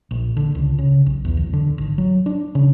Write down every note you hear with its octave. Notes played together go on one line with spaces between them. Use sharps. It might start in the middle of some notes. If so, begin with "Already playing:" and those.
A#1
D3
C#2
C#3
B1
E2
D1
D3
G#1
F#3
D4
C#3